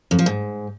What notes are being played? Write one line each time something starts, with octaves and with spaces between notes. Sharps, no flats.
F2
F3
G#2